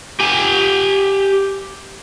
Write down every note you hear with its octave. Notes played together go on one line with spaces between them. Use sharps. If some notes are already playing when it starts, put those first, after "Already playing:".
G4 G#5